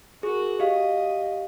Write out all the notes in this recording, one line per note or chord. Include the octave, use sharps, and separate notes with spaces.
F#4 G#4 A#4
G4 D#5 F5